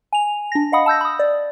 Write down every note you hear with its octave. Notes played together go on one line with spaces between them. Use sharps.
G#5 F7
D4 A#6
D#5 F5 F#5 B5 D#6
A5 E6 G6 A#6
B5 D#6
D5